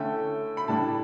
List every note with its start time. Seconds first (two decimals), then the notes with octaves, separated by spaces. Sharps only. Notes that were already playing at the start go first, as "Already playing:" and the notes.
Already playing: D3 A3 C#4 E4 G5
0.57 B5
0.68 A2 G3 D4 A5